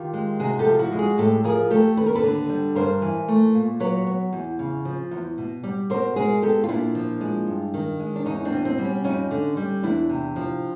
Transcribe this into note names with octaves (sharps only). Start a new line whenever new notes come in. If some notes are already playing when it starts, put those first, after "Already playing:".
Already playing: D#3 F4 G4
G#3
C3 F#4 G#4
G4 A4
F3
E4 F#4
G#3
F#4 G#4
A2 G4 A4
F3 G#4 A#4
A3 G4 A4
D#2 B4
A#4
A4 B4
D3
G3
G2 A#4 C5
E3
A3
A#2
F#3 B4 C#5
B3
E2
C#3
F3
E2
B2
G3
B2 A#4 C5
G#3 G#4 A#4
B3 G4 A4
F4
A#2 D4 E4
F3
G#3
G2
D#3
G#3
D4
E2 C#4 D#4
C4 D4
B2
C4
G3
C#4
F2 C#4 D#4
D3
G3
E2 D4 E4
C3
F3